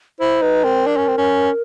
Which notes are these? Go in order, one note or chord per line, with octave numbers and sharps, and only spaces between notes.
E4 C5
D#4 B4
C4 A#4
D4
C#4
C4
C#4